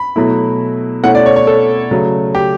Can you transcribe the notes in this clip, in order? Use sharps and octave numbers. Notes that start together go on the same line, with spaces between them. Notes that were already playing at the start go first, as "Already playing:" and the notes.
Already playing: B5
B2 F#3 A3 E4
B2 A3 C#4 E4 F#5
D5
C#5
C#5
A4
C#3 F#3 A3
G4